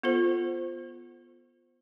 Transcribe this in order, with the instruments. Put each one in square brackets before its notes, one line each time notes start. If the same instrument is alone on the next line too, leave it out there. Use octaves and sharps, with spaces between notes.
[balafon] B3 F4 A4 C5